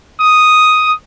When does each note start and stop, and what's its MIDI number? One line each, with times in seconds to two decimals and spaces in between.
0.18 0.92 87